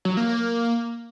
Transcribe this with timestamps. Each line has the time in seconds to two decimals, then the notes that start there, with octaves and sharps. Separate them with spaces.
0.05 F#3
0.17 A#3
0.29 A#3